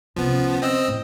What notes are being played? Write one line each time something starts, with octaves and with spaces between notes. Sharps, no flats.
C#2 C3 F3 B3
D3 C#4
C4 D#5 E6
A2